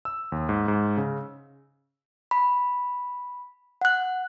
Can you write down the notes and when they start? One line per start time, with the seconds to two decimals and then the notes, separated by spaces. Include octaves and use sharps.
0.05 E6
0.32 D#2
0.49 G#2
0.68 G#2
0.97 C#3
2.31 B5
3.81 F#5 F#6